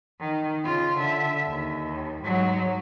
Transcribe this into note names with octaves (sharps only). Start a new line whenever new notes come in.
D#3
C#3 F4
D3 E5
D#2
G#2 F#3